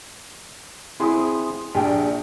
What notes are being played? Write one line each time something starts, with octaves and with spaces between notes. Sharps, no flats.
C4 E4 G#4 C6 D#6
A#1 D4 G4 G#4 G5